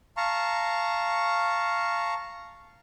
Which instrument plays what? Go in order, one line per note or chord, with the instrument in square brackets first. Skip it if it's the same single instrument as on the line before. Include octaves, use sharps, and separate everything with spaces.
[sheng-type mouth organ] F5 A5 A#5 C#6